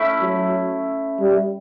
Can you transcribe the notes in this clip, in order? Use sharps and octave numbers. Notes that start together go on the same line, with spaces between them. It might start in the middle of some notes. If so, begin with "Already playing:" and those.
Already playing: A3 C#4 E4
F#3
G3